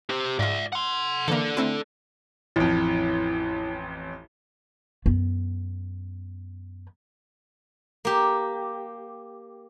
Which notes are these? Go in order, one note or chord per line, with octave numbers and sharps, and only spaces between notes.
G4 C5
G#2 F4 D5 E5
F#5 C6
D3 E3 A#3 A4 D5
A3 C4 E4
A1 F2 E4
F#2 B3
A#3 G4